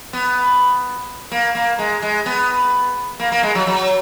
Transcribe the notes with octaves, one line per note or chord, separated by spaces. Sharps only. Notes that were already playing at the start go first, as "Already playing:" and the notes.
B3
A#3
A#3
G#3
G#3
B3
A#3
A#3
G#3
F#3
F#3